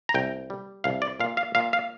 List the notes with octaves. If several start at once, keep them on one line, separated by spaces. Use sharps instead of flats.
A#5
C2 G5
G3
C2 F5
D5
A#2 F5
F5
A#2 F5
F5